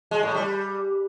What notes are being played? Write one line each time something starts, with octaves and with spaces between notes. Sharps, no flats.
G#3
A2
G3